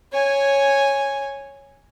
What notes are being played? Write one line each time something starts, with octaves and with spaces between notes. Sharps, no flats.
C#5 G#5